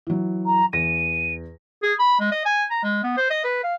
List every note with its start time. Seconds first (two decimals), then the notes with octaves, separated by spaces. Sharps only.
0.07 E3 F#3
0.46 A#5
0.73 E2 A#6 D#7
1.83 G#4
1.99 B5
2.20 G#3
2.31 D#5
2.45 G#5
2.70 A#5
2.83 G#3
3.03 B3
3.17 C5
3.30 D#5
3.44 B4
3.63 F5